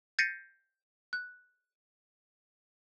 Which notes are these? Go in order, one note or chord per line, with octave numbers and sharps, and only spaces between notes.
G6 A6 A#6 C7 C#7 D#7
F#6